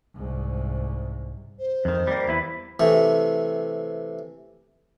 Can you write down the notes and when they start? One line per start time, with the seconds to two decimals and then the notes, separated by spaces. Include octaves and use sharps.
0.16 C2 G#2
1.59 C5
1.85 F2 D#3
2.07 G3 A#3
2.28 E2 E4 B4
2.80 C3 E3 A3